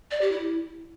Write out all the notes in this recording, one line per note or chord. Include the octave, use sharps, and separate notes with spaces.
D5
G4
E4